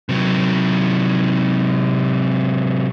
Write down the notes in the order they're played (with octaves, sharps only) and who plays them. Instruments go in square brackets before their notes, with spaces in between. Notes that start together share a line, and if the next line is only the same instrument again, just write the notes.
[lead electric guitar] C3 F#3